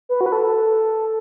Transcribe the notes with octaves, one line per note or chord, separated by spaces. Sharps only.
B4
F#4
B4
A4